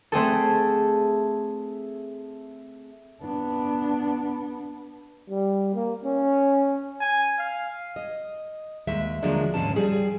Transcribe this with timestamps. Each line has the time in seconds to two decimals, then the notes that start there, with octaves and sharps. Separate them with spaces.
0.12 A3 C4 G#4 A4
3.22 B3 D4
5.30 G3
5.74 A#3
6.04 C#4
7.01 G#5
7.39 F5
7.96 D#5
8.87 D#2 G#3 E5
9.23 D3 F3 F#3 G#3 A#3 D4
9.54 D#2 G#2 C#3 G#3 C#4 A5
9.76 F3 G3 G#4